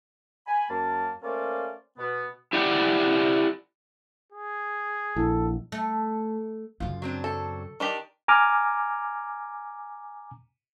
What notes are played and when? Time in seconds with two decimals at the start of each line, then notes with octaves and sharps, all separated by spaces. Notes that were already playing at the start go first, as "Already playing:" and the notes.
0.47 G#5 B5
0.69 F#2 A#3 A5
1.23 A3 A#3 C#4 C5 D5 F5
1.98 B2 B3
2.53 E4 G4 D5 F#5 G5
4.32 G#4
5.16 A#1 E4 A4
5.72 A3
6.80 F#2 C#3 F4
7.02 F#3 C4 D4
7.24 A4
7.80 D#3 D4 G4
8.28 G#5 A#5 D6 F6